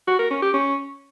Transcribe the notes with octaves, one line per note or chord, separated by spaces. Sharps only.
F#4
A#4
C#4
G4
C#4